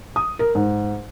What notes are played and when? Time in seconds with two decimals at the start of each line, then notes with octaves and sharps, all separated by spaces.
0.16 D#6
0.39 A#4
0.55 G#2